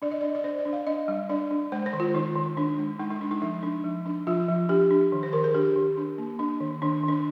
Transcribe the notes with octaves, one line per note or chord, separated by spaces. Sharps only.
D4 D5
D#5
D4 D5
D5
D4 C5
D5
D4
F5
D4 D#5
G3
D4 D5
D4
G#3 C5
C5
D#3
F4
D#3 D#4
D#3
D#3 D4
G#3
G#3 D#4
D#4
G#3 D4
D#4
F3 D#4
D4
F3
D4
F3 F4
F3
D4 G4
D4
D#3
C5
D#3 A#4
G#4
D4 G4
D#3
D4
A#3
D4
D#3
D#3 D4
D#3 D4